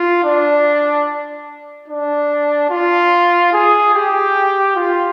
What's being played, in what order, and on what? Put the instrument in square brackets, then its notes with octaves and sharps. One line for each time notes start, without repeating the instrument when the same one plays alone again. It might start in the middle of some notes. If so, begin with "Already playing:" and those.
Already playing: [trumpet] F4
D4
D4
F4
G#4
G4
F4